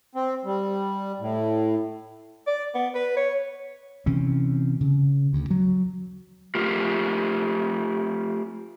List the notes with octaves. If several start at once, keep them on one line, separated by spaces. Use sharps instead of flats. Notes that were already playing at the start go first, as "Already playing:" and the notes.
C4
G3
A2
D5
B3
B4
C#5
C3 E3 C4 C#4
C#3
D2
F#3
A3 F4 G4 A#4